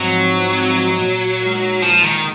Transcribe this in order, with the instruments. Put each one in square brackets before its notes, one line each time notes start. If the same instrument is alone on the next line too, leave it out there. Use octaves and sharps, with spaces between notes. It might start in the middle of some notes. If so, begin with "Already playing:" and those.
Already playing: [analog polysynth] G#2 F3 C4 D#4 [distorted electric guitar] F#3
[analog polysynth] G#2
F3 C4 D#4
A#2
G#3 D#4 A#4
[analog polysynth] A#2 [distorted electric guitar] F3
[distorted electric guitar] D#3